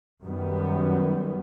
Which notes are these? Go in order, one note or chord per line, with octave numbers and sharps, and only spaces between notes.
F#2 D#3 G3 B3